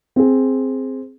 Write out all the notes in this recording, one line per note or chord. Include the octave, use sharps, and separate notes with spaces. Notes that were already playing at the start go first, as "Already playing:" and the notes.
C4 G#4